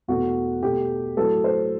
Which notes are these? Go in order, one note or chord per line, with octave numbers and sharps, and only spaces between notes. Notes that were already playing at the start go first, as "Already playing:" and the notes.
E2 B2 A3 F#4
B2 A3 G4
A2 F#3 A3 A4
C5